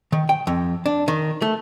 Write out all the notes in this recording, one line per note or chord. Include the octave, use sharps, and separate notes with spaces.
D#3
G5
F2
D4
D#3
A3